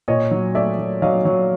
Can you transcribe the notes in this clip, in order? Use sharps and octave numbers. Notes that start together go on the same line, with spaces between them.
A#2 C#5 D#5
F#3
A3 D5 E5
F#3
F#3 D#5 F5
F#3